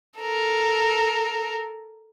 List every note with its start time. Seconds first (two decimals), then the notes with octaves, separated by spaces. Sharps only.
0.20 A4 A#4